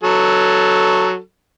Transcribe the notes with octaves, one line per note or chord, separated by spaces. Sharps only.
F#3 A4